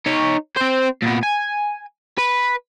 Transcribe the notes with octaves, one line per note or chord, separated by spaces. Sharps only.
D#4 C#5
C4 C5
A#2 B3
G#5
B4